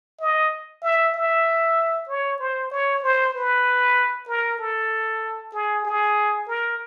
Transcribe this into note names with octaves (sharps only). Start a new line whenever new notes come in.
D#5
E5
E5
C#5
C5
C#5
C5
B4
A#4
A4
G#4
G#4
A#4